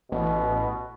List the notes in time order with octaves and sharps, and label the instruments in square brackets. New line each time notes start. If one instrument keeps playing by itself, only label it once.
[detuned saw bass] A1 [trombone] B2